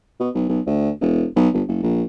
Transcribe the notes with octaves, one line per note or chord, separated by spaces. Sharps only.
B2
B1
B1
D2
E1
B1
G1
F#1
A#1